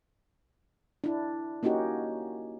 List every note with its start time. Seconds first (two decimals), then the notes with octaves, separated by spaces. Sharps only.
1.04 D4 E4
1.63 A#3 C#4 D#4 F#4 G4